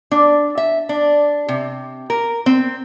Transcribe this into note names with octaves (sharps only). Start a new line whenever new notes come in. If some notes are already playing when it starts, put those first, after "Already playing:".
D4
E5
D4
C3
A#4
C4